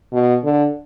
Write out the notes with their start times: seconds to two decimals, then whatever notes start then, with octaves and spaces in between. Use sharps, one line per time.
0.12 B2
0.44 D3